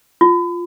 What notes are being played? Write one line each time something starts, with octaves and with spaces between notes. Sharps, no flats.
F4